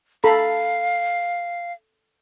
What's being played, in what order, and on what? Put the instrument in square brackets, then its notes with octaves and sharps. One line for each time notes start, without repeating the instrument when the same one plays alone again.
[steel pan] A4 A#5 B5 [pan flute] F5